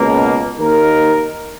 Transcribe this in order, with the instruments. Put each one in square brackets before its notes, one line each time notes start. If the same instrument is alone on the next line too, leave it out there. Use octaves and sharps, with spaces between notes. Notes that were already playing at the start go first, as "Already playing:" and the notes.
Already playing: [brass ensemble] C#2 B2 A#3
D#2 D#3 A#3 D#4 A#4